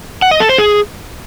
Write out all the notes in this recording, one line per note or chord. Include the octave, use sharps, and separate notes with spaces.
F#5
D#5
A4
C5
G#4